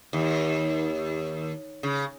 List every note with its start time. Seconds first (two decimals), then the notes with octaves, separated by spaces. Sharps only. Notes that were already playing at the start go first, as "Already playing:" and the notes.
0.13 D#2
1.83 C#3